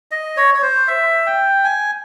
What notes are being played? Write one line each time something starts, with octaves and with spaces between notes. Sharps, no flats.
D#5
C#5
C#5
C5
E5
G5
G#5